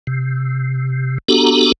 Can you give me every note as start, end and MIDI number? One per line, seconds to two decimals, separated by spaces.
0.07 1.18 48
1.28 1.72 59
1.28 1.72 62
1.28 1.72 66
1.28 1.72 67
1.28 1.72 69
1.28 1.72 82